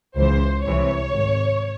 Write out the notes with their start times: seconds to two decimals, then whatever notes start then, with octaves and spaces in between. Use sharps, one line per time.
0.16 C#2 C#3 E3 C5
0.65 C2 C3 E3 C#5
1.12 G#1